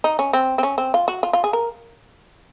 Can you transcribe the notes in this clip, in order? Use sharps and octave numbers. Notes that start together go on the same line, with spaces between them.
D#4
C#4
C4
C4
C#4
C4
F4
F#4
F4
F4
G#4
A#4